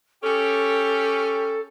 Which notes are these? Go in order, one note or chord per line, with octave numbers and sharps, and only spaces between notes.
C#4 G4 A4